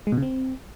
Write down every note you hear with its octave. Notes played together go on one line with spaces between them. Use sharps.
G#3
B2
C#3
C4